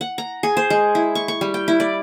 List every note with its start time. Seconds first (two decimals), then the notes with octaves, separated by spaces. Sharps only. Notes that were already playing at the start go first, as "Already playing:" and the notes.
0.01 F#5
0.18 A#5
0.43 G#4
0.57 C5
0.70 G#3
0.95 E4
1.15 C#6
1.28 C#6
1.41 G3
1.54 G5
1.68 E4
1.80 D5